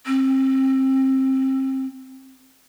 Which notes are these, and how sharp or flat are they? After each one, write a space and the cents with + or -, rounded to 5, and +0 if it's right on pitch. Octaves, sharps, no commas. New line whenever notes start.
C4 +25